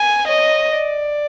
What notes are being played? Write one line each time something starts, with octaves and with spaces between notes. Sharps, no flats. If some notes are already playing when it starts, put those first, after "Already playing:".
Already playing: G#5
C#5 D#5
D5